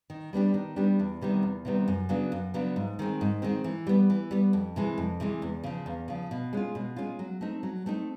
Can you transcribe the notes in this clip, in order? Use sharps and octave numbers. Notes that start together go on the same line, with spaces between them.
D#3
G3 B3 D4 G4
D#3
G3 B3 D4 G4
E2
C3 D#3 G3 B3
E2
C3 D#3 G3 B3
F#2
C#3 F#3 B3 D4
F#2
C#3 F#3 B3 D4
G#2
D#3 G#3 C4
G#2
D#3 G#3 C4
E3
G3 B3
E3
G3 B3
F2
C3 E3 G#3
F2
C3 E3 G#3
E2
C#3 F3
E2
C#3 F3
B2
G#3 C#4 F4
B2
G#3 C#4 F4
F#3
A3 C4 D#4
F#3
A3 C4 D#4